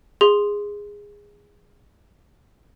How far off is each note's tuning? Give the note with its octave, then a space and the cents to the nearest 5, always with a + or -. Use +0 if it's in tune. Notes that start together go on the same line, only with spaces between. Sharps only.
G#4 -15 C6 +0